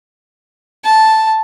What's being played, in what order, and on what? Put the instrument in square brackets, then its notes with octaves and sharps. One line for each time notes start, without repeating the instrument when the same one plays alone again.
[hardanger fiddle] A5